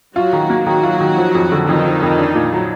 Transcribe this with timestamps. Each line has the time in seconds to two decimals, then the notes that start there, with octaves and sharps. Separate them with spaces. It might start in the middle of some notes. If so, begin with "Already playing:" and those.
0.15 F#3 F4 F#4
0.33 D#3
0.50 A#3
0.66 D#3 F#3 F#4
0.83 F4
1.00 D#3
1.17 F3
1.35 F2
1.52 D3
1.68 F2 D#3 D#4
1.85 F3
2.02 F2
2.19 D4
2.35 A#2
2.53 F#3